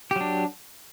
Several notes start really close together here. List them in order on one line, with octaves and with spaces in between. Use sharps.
G4 F#3 D4